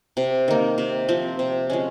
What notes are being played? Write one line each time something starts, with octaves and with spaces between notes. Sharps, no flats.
C3
D#3 A#3
C3
F3 C4
C3
F3 G#3 C#4